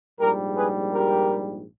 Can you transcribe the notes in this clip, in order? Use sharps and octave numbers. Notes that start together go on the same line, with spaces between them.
A#1 G#2 G3 G4 A#4
G#4 B4
G4 A#4